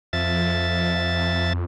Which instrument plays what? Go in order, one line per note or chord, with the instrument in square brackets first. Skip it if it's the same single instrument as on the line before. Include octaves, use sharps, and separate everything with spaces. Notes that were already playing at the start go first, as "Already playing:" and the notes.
[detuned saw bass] F2 [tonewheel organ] F3 E5 A6